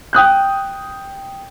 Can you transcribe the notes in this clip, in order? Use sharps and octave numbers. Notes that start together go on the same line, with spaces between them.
G5 D#6 F#6 G6